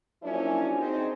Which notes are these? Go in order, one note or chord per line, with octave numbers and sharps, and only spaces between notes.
F3 F#3 A#3 C#4 D4 E4
C4 D#4 G#4